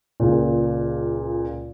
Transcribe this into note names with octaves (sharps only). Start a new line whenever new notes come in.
C#2 A#2